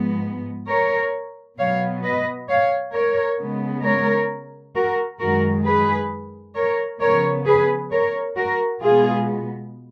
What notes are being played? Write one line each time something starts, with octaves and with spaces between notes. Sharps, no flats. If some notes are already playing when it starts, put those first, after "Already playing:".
Already playing: G#2 F3 G#3 B3
A#4 C#5
B2 F#3 B3 C#5 F5
B4 D#5
C#5 F5
A#4 C#5
C#3 G#3 B3
A#4 C#5
F#4 A#4
F#2 D#3 G#3 F#4 A#4
G#4 B4
A#4 C#5
C#3 F3 B3 A#4 C#5
G#4 B4
A#4 C#5
F#4 A#4
B2 G#3 B3 F4 G#4